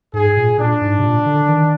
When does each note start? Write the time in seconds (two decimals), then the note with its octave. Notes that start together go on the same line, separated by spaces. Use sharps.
0.13 G#2 G#4
0.37 A#2
0.58 A#2 D4
0.81 G#2
0.98 C3
1.03 A#2
1.26 D3
1.48 D#3